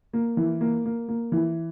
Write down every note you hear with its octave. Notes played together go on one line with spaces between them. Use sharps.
A#3
E3
A#3
A#3
A#3
E3